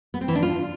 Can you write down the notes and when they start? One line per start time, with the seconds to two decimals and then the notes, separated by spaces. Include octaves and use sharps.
0.14 B3
0.21 C4
0.28 E3
0.35 D4
0.43 F4